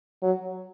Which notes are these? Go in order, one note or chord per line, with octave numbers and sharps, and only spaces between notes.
F#3